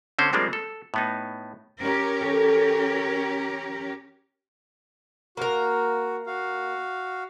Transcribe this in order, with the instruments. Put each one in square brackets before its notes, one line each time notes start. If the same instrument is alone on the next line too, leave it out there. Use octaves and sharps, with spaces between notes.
[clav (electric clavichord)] D3 C4 C#4 C5
F3 G3 G#3 A#3 C4 D4
A4
A2 B3 D#4
[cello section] C#4 G4 A#4
[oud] E3 A4 C#5
[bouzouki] A#3 A#4 [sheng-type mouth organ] F#4
[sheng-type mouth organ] F#4 F5